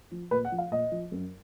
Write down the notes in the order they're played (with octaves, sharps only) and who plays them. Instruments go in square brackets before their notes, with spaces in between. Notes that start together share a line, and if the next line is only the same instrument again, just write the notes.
[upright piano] F3
A#2 B4
F#5
F3
F5
A#2 D#5
F3
F#2